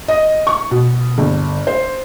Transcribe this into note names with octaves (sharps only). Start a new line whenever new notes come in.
D#5
C#6
B2
G1
C5